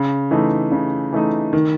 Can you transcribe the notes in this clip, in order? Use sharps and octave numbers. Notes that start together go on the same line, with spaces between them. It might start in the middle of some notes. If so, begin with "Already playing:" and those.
Already playing: C#3
E3 A3 D#4
C#3
E3 A3 D#4
D#3